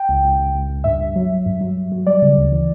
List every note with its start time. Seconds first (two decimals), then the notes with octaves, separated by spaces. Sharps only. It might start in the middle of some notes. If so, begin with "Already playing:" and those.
Already playing: G5
0.09 C#2
0.24 C#2
0.39 C#2
0.55 C#2
0.70 C#2
0.84 G2 E5
1.00 G2
1.16 F#3
1.30 F#3
1.46 G2
1.61 F#3
1.77 G2
1.92 F#3
2.07 G3 D5
2.22 C#3
2.37 D2
2.52 E3